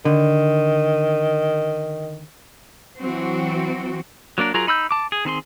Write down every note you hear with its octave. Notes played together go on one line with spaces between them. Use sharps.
D3 D#3
E3 F#3 C4 F#4
F#3 A#3 D4 A#4
F#3 F4 G#4 A#4 A#5
D#4 B5 E6 G6
A5 D6
G#4
D#3 C4 G#4 C6